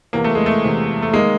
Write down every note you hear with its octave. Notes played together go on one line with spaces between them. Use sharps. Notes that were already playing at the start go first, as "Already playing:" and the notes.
E2 C3 E3 A#3
A3
G#3
A3
E2 C3 E3
A3
D#3 G#3 A#3